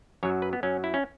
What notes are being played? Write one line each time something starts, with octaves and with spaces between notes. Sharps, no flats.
F#2 F#3 C#5
B4
B3
F#2 F#3 C#4
E4
C#4